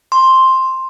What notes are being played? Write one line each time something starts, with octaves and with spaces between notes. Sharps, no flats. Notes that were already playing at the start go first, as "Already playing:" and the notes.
C6